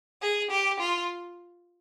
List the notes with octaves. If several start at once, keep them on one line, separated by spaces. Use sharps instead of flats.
G#4
G4
F4